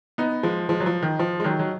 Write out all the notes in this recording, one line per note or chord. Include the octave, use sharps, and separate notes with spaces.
B3 D#4
F3 G#3
F3 G#3
F#3
F3
D#3
F3
G#3
D#3 F#3
F#3